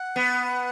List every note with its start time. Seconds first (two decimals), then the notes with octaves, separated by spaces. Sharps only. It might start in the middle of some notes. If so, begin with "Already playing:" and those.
Already playing: F#5
0.16 B3